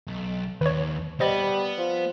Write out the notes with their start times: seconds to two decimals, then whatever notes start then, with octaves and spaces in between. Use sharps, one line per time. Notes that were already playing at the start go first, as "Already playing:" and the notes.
0.07 B1
0.61 D#2 B4 C#5
1.20 G3 B3 C5 D#5 A6
1.78 F3